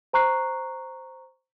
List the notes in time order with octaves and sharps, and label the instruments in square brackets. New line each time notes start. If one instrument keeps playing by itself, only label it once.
[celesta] C5 A#5 C#6 F#6 C7